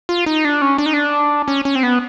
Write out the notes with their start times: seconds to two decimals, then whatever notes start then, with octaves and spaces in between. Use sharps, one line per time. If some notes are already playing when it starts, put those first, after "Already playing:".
0.09 F4
0.26 D#4
0.45 D4
0.62 C#4
0.78 D4
0.86 D#4
0.94 D4
1.48 C#4
1.65 C#4
1.75 C4
1.83 B3